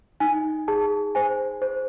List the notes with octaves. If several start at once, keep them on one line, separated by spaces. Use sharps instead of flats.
D#4 G#5
G#4 A5
C5 G#5
C5